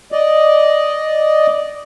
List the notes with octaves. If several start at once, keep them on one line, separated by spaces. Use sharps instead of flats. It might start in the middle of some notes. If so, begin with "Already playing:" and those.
D5 D#5